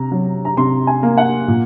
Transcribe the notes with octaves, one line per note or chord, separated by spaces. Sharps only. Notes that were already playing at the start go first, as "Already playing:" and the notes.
Already playing: C3 A#5
F#3
A#5
C3 C6
G#5
A#3
F#5
A#2